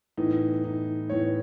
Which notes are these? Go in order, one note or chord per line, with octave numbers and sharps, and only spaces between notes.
A2 E3 B3 D#4
D#4
A2 E3 B3 C#5